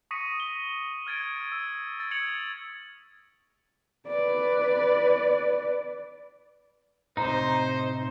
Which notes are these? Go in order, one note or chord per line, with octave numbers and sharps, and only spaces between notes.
C#6 D#6 A#6 B6 C#7 D#7
G7
F6 G#6 A6 D7
E6
E6 A6
G#6 A6 C#7 F7 F#7
B4 D5
A2 C3 D#4 C5 A#5